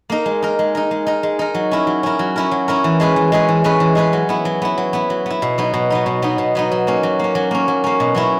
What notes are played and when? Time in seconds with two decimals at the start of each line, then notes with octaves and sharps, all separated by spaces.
0.10 A#3 D#4 A#4
0.26 G#3
0.42 D#4 A#4
0.59 G#3
0.75 D#4 A#4
0.91 G#3
1.07 D#4 A#4
1.23 G#3
1.39 D#4 A#4
1.55 F#3
1.71 C#4 E4 A#4
1.87 F#3
2.03 C#4 E4 A#4
2.19 F#3
2.36 C#4 E4 A#4
2.51 F#3
2.68 C#4 E4 A#4
2.84 E3
3.00 G#3 C#4 G#4 B4
3.16 E3
3.32 G#3 C#4 G#4 B4
3.49 E3
3.64 G#3 C#4 G#4 B4
3.80 E3
3.95 G#3 C#4 G#4 B4
4.13 F#3
4.29 B3 E4
4.45 F#3
4.62 B3 E4
4.78 F#3
4.93 B3 E4
5.10 F#3
5.26 B3 E4
5.42 B2
5.58 F#3 B3 D#4
5.74 B2
5.90 F#3 B3 D#4
6.06 B2
6.22 F#3 B3 D#4
6.38 B2
6.55 F#3 B3 D#4
6.71 F#3
6.87 A#3 C#4
7.03 F#3
7.19 A#3 C#4
7.35 F#3
7.51 A#3 C#4
7.68 F#3
7.84 A#3 C#4
8.00 B2
8.15 F#3 C#4 E4